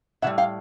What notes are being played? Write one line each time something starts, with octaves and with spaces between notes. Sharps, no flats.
A2 E3 G3 E5 F#5
F5 G5